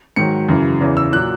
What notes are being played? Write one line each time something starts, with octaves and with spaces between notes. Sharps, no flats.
G#2 D#3 F#3 C#7
F#2 C#3 E3
E2 C#3 E3
E6
A#2 F#3 F#6